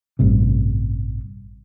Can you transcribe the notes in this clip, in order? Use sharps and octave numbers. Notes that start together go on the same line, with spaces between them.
A1 G2 C3